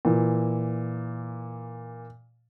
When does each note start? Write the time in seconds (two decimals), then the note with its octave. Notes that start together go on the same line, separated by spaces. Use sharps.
0.05 A#2 E3